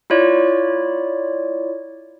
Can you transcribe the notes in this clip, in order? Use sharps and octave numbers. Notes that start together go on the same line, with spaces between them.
E4 F4 C#5 D5